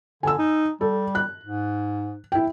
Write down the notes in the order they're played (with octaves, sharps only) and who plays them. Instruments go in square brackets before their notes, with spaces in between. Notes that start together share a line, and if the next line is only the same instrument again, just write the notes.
[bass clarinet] D3 [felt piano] G#5 A5 E6
[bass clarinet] D#4
[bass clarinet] G3 [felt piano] A4
[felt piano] F#6
[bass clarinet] G#2
[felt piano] E4 G5